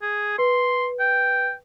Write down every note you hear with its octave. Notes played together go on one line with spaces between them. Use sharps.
G#4
B4 C6
G5